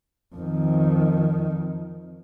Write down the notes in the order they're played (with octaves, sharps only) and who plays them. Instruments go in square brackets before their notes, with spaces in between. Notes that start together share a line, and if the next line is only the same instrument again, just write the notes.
[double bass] F2 D#3